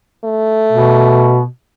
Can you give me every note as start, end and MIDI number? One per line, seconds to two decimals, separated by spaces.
0.24 1.40 57
0.72 1.45 47